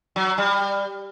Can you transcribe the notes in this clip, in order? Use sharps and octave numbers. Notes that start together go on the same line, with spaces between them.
F#3
G3